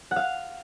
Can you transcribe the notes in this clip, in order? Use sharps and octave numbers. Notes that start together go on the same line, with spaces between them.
F#5
F5